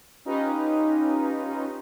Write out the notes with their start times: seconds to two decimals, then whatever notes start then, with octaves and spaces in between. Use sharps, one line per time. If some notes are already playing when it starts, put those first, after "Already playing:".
0.25 C#4 D#4 F4 G4 B4 D#5